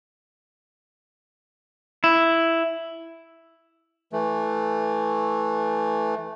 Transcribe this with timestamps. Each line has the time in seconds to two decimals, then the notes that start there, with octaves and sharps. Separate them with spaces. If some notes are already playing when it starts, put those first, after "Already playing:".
2.04 E4
4.13 E3 A3